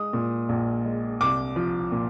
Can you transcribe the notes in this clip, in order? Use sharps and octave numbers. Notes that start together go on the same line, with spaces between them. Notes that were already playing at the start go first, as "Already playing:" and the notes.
Already playing: G#3 D#6
A#2
A#1
G#3
C2 D6
F3
A#2